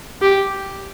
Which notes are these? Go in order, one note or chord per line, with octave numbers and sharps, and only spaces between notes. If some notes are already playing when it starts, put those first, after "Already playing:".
G4